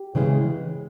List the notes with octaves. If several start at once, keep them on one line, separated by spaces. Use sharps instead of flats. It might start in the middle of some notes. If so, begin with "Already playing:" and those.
Already playing: G4
C#3 E3 G#3 C#4